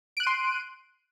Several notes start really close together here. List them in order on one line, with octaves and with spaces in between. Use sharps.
D7 F#6 D#7 C6